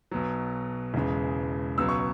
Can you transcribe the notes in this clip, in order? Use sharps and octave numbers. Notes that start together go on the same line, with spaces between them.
B1 B2 F#3
E1 E2 C#3 G#3
C#2 B2 F#3 E6
C#6